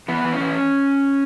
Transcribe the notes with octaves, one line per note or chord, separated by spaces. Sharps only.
E3 B3
E3
C#4
E3